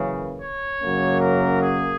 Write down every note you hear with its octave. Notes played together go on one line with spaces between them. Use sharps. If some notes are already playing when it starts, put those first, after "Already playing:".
Already playing: F#2 C#3 E3 A#3 B4
C#5
F#2 C#3 F#3 A#3 C#4
A#4
G#4